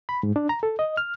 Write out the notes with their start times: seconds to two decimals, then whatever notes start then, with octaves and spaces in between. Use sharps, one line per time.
0.09 B5
0.23 G#2
0.36 D4
0.49 A#5
0.63 A4
0.79 D#5
0.97 F6